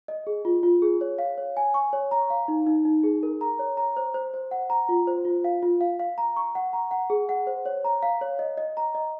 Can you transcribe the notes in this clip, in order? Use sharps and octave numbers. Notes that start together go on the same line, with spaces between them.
D#5
G#4
F4
F4
G#4
C#5
F5
C#5
G#5
C#6
C#5
A#5
F5
D#4
D#4
D#4
G#4
A#4
A#5
C#5
A#5
C5
C5
C5
F#5
A#5
F4
C5
F4
F5
F4
F5
F5
A#5
C#6
F#5
A#5
F#5
G#4
F#5
C5
C#5
A#5
F5
C#5
D#5
D#5
A#5
D#5